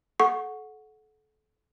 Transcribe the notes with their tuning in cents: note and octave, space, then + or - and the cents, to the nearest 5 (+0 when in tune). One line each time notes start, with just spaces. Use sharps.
A4 -35 F#5 -10 C#6 +0